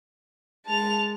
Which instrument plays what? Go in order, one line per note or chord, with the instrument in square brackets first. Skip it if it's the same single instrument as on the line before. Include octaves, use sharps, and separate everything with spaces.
[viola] G#3 [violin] A5 F7